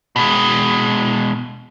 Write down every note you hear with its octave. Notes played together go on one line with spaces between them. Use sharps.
B2 G#3